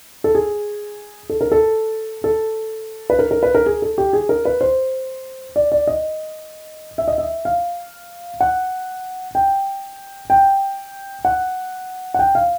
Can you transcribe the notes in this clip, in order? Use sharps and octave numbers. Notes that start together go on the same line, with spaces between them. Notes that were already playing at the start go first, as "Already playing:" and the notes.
A4
G#4
A4
A#4
A4
A4
B4
A#4
A#4
B4
A#4
G#4
A4
G4
G#4
A#4
B4
C5
D5
D5
D#5
E5
D#5
E5
F5
F#5
G5
G5
F#5
F#5
G5
F5